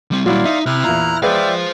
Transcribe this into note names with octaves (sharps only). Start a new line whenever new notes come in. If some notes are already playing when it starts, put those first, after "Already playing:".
G3 C4
A#2 F#3 G3 E4 D5 F5 C6
D#4 E5
C3 E4 F6 F#6
E2 A#2 A#5
G#3 B4 C5 D5 E5 F5 G5